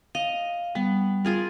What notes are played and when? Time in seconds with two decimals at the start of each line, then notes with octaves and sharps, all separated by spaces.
0.15 D#5 F5
0.75 G3 B3
1.25 F4 G#4 A#4